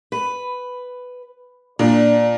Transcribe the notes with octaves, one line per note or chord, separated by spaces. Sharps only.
B4
A#2 D4